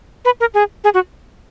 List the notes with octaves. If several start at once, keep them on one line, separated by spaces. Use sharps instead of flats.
B4
A#4
G#4
G#4
F#4